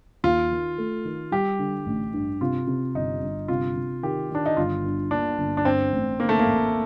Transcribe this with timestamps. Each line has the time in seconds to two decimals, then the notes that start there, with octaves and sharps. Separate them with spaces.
0.23 D#2 F4
0.51 D#3
0.78 A3
1.05 D#3
1.32 G3 G4
1.59 D3
1.86 A1
2.13 G2
2.41 C3 F4
2.67 C3
2.95 G1 D#4
3.22 G1
3.48 C3 F4
3.76 C3
4.03 D#3 G4
4.31 D#3 D4
4.46 D#4
4.57 G1 F4
4.84 G2
5.11 A#3 D4
5.38 G1
5.57 D4
5.65 G2 C4
5.92 A1
6.19 D3 A#3
6.29 A3
6.39 A#3
6.46 A1